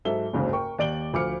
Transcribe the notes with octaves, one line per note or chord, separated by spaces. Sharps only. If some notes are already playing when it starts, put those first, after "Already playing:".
G#2 F#3 A4 E5 G7
F#1 D2 G#2 C#3
A#4 G5 C#6
D#2 D5 D7 F#7 G7
D2 F3 D6 F6 C#7